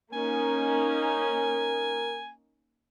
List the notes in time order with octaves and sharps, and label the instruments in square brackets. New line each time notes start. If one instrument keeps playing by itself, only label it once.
[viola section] A#3 C#4 D#4 [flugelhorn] A#4 [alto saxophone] G#5